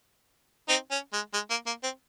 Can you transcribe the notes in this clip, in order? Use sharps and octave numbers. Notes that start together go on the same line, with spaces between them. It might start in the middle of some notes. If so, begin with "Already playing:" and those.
C4 D#4
C#4
G#3
G#3
A#3
A#3
C4